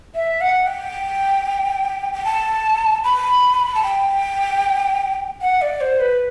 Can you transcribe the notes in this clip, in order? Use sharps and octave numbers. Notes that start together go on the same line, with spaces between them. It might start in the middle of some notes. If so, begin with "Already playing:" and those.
E5
F#5
G5
G5
A5
B5
A5
G5
F#5
D5
C5
B4